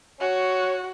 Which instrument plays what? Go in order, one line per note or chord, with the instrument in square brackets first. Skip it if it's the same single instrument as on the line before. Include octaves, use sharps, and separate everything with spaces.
[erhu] F#4 [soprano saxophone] C#5